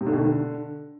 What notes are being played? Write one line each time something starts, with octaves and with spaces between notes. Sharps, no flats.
C3
D3
B2
D#3
D3